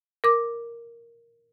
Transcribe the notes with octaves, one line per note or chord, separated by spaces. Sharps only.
A#4 D6